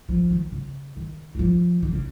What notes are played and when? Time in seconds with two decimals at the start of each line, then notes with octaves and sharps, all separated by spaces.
0.09 F3
0.30 D#3
0.52 C#3
0.96 D#3
1.35 F#3
1.39 F3
1.82 D#3
1.92 C#3